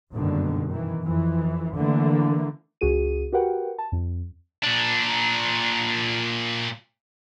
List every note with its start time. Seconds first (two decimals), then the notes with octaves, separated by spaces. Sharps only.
0.13 F#1 G2 B2 D3 D#3
0.69 D#3 E3
1.04 F2 E3
1.75 D3 E3 A3 A#3
2.81 C#2 F#4 G#4 D#7
3.32 F#4 G4 A#4 B4 F#5 G5
3.78 A5
3.92 F2
4.64 A#2 D4